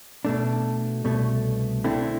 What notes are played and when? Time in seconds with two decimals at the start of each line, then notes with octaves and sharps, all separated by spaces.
0.25 B2 A3 D4
1.04 C2 B2 A3
1.84 D3 A3 C4 E4